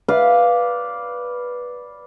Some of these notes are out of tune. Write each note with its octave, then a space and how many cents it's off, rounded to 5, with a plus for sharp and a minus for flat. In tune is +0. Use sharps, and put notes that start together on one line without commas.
B4 -10 D5 -5 F5 +0